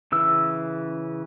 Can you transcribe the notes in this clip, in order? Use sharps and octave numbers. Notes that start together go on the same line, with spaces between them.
C#3 E3 E6